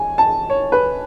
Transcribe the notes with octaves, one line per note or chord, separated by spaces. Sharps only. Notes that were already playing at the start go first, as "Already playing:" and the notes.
Already playing: G#5
A5
C#5
B4